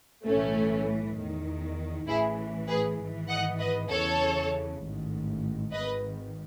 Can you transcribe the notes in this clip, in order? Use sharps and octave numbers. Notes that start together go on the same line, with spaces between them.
B1 A2 E3 A3 C#4
E2 D#3
A1 A2 E3 E4 G#4
G#4 B4
G#1 G#2 E3
D#5 F#5
B4 D#5
E2 C#3 E3 A4 C#5
A1 G#2 D#3
G#1 G#2 D#3 B4 D#5